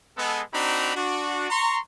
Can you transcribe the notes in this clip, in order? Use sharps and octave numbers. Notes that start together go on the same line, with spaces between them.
G#3 B3 A4
C4 D4 D#4 F#4 A#5 B5
D4 F#4
A#5 C6 C#6